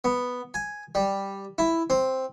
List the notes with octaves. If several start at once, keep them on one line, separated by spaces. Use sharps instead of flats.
B3
G#5
G3
E4
C4